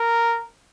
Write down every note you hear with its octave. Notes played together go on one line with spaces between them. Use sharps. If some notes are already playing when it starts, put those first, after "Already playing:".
Already playing: A#4